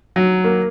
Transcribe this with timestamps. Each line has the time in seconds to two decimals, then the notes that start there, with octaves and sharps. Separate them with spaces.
0.16 F#3
0.44 A#3